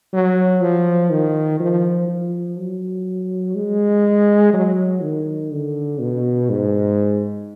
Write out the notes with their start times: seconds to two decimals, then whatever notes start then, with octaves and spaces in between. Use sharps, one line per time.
0.13 F#3
0.62 F3
1.10 D#3
1.60 F3
2.09 F3
2.57 F#3
3.56 G#3
4.53 F#3
5.02 D#3
5.51 D3
6.00 B2
6.49 G#2